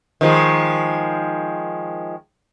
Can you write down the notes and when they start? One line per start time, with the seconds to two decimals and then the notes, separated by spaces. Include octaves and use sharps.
0.21 D#3 F3 G#3